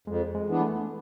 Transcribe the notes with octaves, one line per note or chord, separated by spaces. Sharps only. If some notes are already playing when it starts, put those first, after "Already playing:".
F2 G#3
G#3
E3 B3 D4
A3